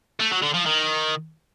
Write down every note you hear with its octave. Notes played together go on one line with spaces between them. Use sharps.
A3
F#3
D3
F3
D#3